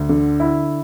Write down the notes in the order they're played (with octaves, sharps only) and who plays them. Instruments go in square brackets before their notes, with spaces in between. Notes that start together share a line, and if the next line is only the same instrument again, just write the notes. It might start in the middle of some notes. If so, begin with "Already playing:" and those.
Already playing: [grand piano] D2
D3
E4